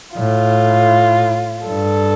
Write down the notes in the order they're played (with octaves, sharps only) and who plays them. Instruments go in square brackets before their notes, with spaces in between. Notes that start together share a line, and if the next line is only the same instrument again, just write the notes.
[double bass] A2 [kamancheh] F4
[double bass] G2 [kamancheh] A4